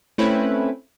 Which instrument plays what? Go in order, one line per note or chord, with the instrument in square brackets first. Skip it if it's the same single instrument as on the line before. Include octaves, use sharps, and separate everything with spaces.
[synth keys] A3 C4 C#4 E4 B4